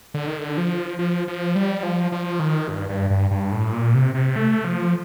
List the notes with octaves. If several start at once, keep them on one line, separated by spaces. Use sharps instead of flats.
D3
D#3
D3
F3
F3
F3
G3
F3
F3
D#3
G2
G2
G2
G2
A2
A#2
C3
C3
A3
F3